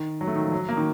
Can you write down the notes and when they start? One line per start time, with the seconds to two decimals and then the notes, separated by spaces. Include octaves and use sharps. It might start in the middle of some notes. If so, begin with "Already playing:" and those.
Already playing: D#3
0.21 F#3
0.27 A3
0.35 D#3
0.44 F3
0.52 F#3
0.69 A#3
0.77 D#3